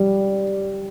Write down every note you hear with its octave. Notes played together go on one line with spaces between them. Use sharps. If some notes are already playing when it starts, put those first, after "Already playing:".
Already playing: G3